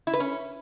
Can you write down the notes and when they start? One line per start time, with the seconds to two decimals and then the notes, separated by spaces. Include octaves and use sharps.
0.07 E4
0.14 B4
0.20 C#4